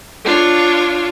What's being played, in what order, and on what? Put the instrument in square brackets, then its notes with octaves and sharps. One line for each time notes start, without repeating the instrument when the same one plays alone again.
[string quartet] D4 F4 C#5